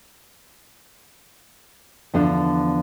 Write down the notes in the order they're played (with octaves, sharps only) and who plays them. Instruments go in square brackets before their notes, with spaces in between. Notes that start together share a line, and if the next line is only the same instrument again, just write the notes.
[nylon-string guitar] E2 D3 F3 D4